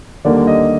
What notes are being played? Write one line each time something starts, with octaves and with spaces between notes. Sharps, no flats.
D#2 D3 G3 A#3 D5
D#5